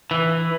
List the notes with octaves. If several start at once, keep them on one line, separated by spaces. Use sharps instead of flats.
E3